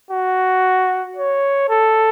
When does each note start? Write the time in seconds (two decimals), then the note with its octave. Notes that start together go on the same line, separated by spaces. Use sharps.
0.11 F#4
1.17 C#5
1.70 A4